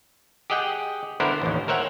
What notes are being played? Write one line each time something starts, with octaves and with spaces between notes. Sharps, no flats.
G4 G#4 D#5 F#5 G5
D3 B3 E4 A#4 C5
A1 D#2
A#4 C5 C#5 E5 F#5 G5